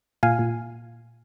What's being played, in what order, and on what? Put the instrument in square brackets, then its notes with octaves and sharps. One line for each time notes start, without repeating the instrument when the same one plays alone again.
[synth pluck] A#2 F5 G#5
A#2